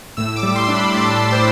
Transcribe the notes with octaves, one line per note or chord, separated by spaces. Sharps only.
A2 E6
D6
G3
C6
D4
B5
A2 A5
A2
C5